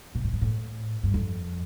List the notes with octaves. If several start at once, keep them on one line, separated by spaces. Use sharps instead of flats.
B2
A2
G2
A2
G2
F2